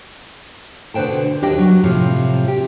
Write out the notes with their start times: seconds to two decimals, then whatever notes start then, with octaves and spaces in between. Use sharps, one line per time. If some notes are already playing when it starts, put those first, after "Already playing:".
0.94 B2 D3 B4 C5 G5 A5
1.42 D#2 D4 G4 D#5 G5
1.58 F#3
1.84 A2 C3 F3
2.48 G4